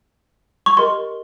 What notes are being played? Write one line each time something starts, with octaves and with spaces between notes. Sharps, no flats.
C#6
G4 A#4 D#5 C6